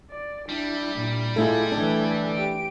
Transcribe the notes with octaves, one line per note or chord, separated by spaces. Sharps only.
D5
G3 D4 E4
A#2
G#3 A3 E4 F4 A4 G#6
E3 A3 D4
G4 D7